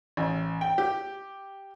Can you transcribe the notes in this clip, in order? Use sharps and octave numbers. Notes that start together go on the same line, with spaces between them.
A1
G5
G4